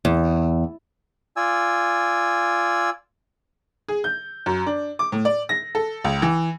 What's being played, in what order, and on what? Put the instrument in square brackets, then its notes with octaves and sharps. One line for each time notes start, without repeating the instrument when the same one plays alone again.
[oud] E2
[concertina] F4 D5 G#5 E6
[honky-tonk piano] G#4
G6
F#2
D4
D6
A2
D5
A#6
A4
C#2
E3